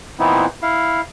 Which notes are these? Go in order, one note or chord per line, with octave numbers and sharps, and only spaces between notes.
A#2 E3 B3 C4 D#4 E4
E4 F5